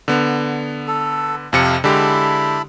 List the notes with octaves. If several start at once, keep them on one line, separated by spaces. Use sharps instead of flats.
D3 B3
A4
F2 C3 F5 A5 C#7
D3 G#3 E4 G4 A5 B5